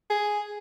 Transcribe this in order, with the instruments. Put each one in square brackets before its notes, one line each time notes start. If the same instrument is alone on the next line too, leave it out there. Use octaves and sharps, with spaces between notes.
[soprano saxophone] G#4